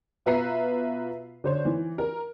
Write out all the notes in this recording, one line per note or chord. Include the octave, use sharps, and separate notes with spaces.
B2 F4 B4 E5 A#5 C7
D3 C5 C#5
E3
A#4